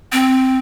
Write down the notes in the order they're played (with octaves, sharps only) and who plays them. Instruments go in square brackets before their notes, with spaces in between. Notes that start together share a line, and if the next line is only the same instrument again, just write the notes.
[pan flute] C4